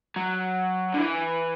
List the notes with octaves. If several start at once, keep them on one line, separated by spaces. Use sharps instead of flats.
F#3
D3
E3